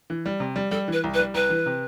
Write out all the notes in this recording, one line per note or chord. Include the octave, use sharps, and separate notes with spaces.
E3
G3
C3
G3
G3 A4
E3 B4
C2
B4
G3
C2 B4
E3
C3